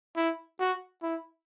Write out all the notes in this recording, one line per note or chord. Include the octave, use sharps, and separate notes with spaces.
E4
F#4
E4